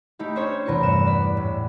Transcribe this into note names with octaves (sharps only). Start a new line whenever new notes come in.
A3 D#4 E4 G4
C#4 D4 A4 C5 C#5
E2 C3 A#4 B4 C#7
G2 F#5 E7
D5 B6
A2